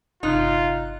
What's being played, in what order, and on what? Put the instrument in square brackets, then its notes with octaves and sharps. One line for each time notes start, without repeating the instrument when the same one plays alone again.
[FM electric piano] G1 C3 F#6 [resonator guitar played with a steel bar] D#4 [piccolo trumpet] F4